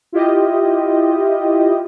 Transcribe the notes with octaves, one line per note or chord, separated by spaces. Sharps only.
E4 F4 G4 D#5